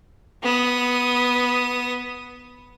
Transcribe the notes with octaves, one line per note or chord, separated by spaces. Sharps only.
B3 D#6